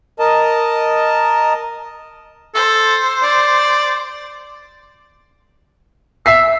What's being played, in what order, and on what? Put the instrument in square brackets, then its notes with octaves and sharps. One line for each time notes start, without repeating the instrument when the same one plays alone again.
[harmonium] A#4 D#5 A5
[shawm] A4 [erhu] C5
[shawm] D5
[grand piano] E5 B6 C7 [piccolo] E6